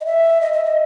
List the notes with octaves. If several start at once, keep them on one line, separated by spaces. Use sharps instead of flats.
D#5
E5
D#5
E5
D#5